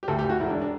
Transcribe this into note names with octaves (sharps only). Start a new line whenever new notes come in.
G4
D2 A4
G4
D2
F#4
E1 E4
D4
D4